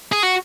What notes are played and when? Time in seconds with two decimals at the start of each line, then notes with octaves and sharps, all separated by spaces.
0.12 G#4
0.23 F#4